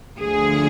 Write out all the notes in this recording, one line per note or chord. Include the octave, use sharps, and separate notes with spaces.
D2 D3 F3 G#4